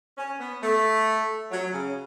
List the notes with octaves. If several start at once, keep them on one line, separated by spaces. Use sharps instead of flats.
C#4
B3
A3
F#3
C#3